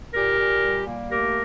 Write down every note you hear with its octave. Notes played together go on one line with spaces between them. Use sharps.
A#2 G4 A#4
A#2
G3
A#3
A3 G4 A#4